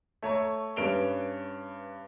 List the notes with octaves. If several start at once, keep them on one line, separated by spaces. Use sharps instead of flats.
A3 C#5 A#5 C#6
G2 C#4 B4 D7 F7 G7